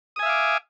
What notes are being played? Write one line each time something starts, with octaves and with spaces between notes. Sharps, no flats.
E5 F5 G#5 D6 D#6